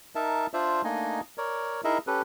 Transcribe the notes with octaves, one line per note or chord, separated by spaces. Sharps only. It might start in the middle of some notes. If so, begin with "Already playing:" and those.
D#4 A#4 E5 A5
D4 F4 C5 D5 E5
A3 A#3 D4 D#4 D#5 G#5
A#4 C#5 D5
D#4 E4 G#4 A#4 D#5 E5
C#4 G4 A4 B4